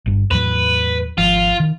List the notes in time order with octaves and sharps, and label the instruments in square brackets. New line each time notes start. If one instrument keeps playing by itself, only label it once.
[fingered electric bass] G1 G2
[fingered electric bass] E2 A2 F#3 [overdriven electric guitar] B4
[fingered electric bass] G#1 F3 [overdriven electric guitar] F4
[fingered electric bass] D#3